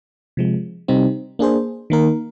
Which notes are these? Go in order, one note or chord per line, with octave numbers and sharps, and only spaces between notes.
C3 F3 G#3
C3 G3 C4 D#4
A#3 D4 G#4 C5
D#3 A#3 D#4 A#4